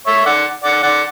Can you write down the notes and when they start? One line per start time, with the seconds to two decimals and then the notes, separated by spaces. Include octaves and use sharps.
0.07 C#5 E5
0.26 D5 F#5
0.64 D5 F#5
0.82 D5 F#5